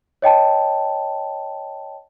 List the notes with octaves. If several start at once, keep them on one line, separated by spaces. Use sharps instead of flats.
C#5 D#5 G5 A5